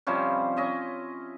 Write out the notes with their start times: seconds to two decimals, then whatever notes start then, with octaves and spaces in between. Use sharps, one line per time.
0.07 C3 F3 G3 C#4
0.56 C#4 D#5 E5